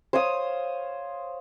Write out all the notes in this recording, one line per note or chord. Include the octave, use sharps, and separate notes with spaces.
C5 C#5 F5 D#6